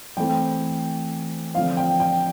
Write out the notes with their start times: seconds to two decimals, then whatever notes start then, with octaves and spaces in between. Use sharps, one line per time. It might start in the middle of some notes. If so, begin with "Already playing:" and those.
0.17 E3 A3 C4 G5
1.54 D3 F3 C4 F5
1.77 G5
2.00 G5